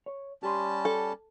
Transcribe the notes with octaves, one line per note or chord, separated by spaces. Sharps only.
C#5
G3 C#4 G4 A5 C6
A4